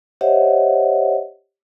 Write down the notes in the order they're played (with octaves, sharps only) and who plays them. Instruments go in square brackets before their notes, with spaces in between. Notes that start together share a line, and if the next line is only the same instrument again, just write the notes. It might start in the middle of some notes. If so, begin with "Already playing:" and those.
[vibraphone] G4 C5 C#5 D#5 E5 F#5